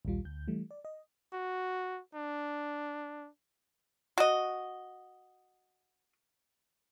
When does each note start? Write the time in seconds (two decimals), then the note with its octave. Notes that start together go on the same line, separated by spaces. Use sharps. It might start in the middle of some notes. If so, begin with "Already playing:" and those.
0.05 A#1 D#2 G3 F4
0.25 D2 G6
0.48 E3 G3 A3
0.71 D5
0.85 D#5
1.33 F#4
2.15 D4
4.18 F#4 D#5